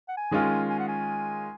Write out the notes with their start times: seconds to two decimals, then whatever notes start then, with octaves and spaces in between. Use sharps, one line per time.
0.08 F#5
0.17 G#5
0.31 D#3 G#3 C#4 F4
0.70 G#5
0.79 F#5
0.88 G#5